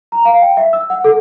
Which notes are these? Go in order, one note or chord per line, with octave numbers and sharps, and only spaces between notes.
A#5
F5
G5
E5
E6
F#5
A4